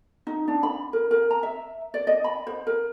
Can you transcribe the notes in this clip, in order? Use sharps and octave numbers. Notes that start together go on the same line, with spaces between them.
D#4
D4
B5
A#4
A#4
A#5
E5
D5
D#5
B5
C5
A#4